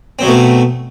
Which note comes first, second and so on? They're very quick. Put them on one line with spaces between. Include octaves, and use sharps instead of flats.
C4 F#3 B2 A3